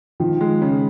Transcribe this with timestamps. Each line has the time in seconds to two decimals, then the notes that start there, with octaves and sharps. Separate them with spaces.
0.20 D#3 F3
0.41 G#3
0.61 C#3